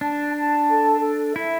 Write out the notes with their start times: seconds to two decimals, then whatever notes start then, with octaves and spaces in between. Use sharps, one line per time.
0.01 D4 A5
0.35 A5
0.69 A4
1.02 A4
1.35 E4 E5